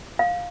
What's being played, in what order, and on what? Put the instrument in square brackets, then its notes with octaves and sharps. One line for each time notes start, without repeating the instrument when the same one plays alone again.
[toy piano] F5